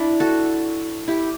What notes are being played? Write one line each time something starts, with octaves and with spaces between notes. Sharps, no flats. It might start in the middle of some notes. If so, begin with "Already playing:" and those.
Already playing: D4 E4
F#4 A4
E4 G4